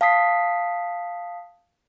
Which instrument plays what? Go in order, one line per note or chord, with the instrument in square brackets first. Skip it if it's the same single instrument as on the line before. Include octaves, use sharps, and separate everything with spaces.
[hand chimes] F5 A5 D#6 B6 C7